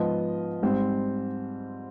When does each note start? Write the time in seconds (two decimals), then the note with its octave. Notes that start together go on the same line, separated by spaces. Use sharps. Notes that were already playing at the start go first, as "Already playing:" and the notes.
Already playing: G#2 F3 B3 D#5
0.63 G#2 G3 C4